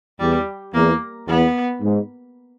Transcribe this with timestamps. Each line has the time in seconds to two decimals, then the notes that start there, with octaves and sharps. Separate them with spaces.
0.19 E2 G3
0.74 E2 A#3
1.28 E2 B3
1.81 G#2